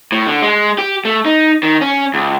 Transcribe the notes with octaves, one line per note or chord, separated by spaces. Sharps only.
A2
D3
G#3
G4
A3
D#4
D#3
C#4
C#2